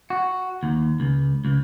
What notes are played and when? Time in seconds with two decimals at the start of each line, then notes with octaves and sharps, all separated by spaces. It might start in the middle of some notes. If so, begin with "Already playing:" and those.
0.10 F#4
0.63 D#2
1.00 C#2
1.45 C#2